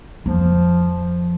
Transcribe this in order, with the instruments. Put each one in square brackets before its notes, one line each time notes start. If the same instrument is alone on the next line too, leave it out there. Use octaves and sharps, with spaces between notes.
[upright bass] F2 [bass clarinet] F3